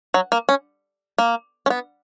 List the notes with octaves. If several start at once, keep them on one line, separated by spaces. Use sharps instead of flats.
F#3
A#3
C#4
A#3
C#4
B3